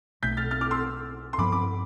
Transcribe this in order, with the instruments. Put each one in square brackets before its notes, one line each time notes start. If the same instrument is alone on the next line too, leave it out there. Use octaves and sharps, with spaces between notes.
[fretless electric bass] B1 B2 A3 [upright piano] G6 B6
[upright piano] F6 A6
F6 A6
D6 F6
C6 E6
C6
[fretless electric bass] G2 F3 B3 [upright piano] B5 D6
[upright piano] B5 D6